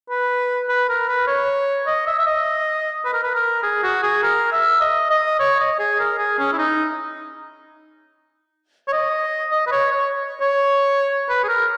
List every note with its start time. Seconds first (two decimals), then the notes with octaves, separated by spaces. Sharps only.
0.10 B4
0.69 B4
0.89 A#4
1.08 B4
1.27 C#5
1.87 D#5
2.07 E5
2.19 E5
2.27 D#5
3.05 B4
3.13 A#4
3.23 B4
3.34 A#4
3.63 G#4
3.83 F#4
4.03 G#4
4.23 A#4
4.52 E5
4.81 D#5
5.10 D#5
5.40 C#5
5.60 D#5
5.79 G#4
5.99 A#4
6.18 G#4
6.39 C#4
6.53 E4
6.58 D#4
8.88 C#5
8.93 D#5
9.52 D#5
9.67 B4
9.72 C#5
9.92 C#5
10.41 C#5
11.29 B4
11.44 G#4
11.48 A#4